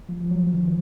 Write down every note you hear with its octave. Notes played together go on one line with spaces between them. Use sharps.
F3
F3
F#3
F3
D#3
F3